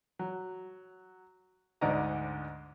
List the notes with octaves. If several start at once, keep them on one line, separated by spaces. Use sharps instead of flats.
F#3
D2 G#2 D3 D5 D#5 A#5